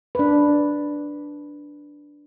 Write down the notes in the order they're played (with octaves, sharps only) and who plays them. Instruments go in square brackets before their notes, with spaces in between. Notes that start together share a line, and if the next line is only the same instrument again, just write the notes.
[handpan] D4 B4